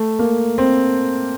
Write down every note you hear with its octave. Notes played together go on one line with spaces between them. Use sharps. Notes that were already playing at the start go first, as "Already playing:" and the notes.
Already playing: A3
A#3
C4